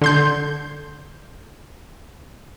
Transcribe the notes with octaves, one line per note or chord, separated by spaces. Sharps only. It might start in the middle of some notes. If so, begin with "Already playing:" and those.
D3 C6 G6